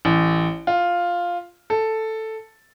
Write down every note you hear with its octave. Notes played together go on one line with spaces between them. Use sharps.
A1
F4
A4